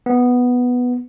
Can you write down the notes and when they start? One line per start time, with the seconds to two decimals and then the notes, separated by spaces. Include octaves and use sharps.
0.06 B3